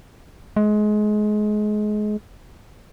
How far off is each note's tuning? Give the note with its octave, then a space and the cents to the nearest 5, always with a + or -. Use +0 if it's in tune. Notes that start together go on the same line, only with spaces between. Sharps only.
G#3 +25